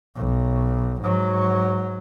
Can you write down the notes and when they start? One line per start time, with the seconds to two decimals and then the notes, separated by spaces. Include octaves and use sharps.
0.16 B1
1.03 G#2 F#3